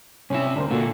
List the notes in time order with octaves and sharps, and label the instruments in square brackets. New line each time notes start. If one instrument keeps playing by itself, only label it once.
[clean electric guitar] C2 C3 E5 [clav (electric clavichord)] C#4 E4
[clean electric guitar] D2 [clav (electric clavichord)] D4 A#4 C5
[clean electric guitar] A#2 D3 [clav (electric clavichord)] A#3 F#4 A4